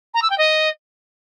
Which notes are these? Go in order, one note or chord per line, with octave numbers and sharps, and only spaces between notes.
A#5
E6
G5
D#5